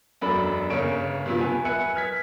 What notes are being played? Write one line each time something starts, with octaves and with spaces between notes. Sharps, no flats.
E1 F#2 D4 A4 B5
G1 C#3 A#3 C#4 D7
G2 C3 F3
B3 G#5
B4 E5 G#5 F#6 C#7
F6 G#6 B6